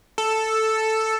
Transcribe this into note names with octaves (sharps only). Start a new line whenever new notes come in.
A4